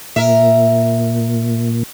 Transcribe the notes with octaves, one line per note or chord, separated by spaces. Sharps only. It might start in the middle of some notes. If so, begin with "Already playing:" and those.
A#2 A#4 E5